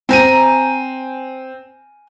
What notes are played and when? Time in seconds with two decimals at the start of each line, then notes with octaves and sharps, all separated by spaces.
0.09 C4 G#5 A#5 D#7